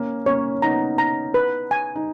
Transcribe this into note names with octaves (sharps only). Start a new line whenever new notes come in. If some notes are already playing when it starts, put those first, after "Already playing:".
Already playing: A#3 C#4
A#3 C#4 C#5
B3 D#4 A#5
A#5
B4
G#5
D#4